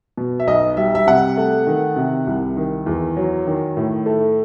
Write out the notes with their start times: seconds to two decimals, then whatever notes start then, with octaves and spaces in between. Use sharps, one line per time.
0.17 B2
0.40 E5
0.47 B1 D#5
0.77 G3 E5
0.95 E5
1.07 C3 F#5
1.37 A3
1.67 D#3
1.96 C3
2.27 C2
2.57 D#3
2.86 E2
3.17 F#3
3.47 D#3
3.77 A2
4.06 A3